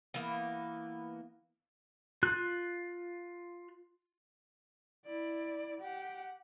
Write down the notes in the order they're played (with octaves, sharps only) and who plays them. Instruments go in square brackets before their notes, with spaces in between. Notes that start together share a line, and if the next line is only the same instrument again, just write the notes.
[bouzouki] E3 A#3 B3
[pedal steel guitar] F4 F#6
[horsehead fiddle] E4 D5
G4 F#5